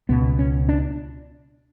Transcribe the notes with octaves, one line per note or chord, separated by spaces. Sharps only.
C#2 B2 B3
C#4
D4